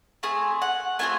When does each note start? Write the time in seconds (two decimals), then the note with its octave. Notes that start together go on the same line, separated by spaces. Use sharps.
0.23 A3 C4 G#4 G#5
0.62 F#5
0.99 A3 C4 F4 G#4 G#5